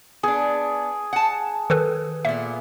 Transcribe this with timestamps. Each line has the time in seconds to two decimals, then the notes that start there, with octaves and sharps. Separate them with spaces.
0.23 B3 D4 G#4
1.13 F#5 A5
1.70 D#3 A4 B4
2.25 A#2 B3 E5